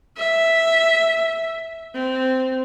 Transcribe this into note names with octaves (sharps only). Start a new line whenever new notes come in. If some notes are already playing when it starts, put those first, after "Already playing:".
E5
C4